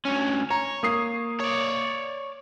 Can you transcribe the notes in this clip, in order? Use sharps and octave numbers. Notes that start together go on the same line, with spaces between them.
D2 C#4
C#5 A#5
A#3 D#6 C7
C#5 D5